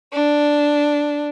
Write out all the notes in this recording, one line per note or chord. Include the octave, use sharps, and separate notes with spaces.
D4